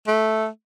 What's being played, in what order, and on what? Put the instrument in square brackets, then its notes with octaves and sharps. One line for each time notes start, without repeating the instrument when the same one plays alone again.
[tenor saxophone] A3